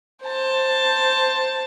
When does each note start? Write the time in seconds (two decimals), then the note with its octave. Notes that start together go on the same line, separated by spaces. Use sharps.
0.23 C5 A5